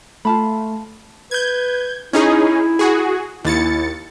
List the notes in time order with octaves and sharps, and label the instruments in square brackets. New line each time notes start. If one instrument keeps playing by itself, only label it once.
[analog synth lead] A3 [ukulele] F4 A5 B5
[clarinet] B4 [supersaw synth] G6 G#6
[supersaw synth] C#4 D#4 G#4 [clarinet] E4
[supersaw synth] F#4 G#4
[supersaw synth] D#2 A6 C#7 [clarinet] E4